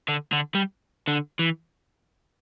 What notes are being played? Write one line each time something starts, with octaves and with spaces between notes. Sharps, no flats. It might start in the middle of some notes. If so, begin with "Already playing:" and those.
D3
D3
G3
D3
E3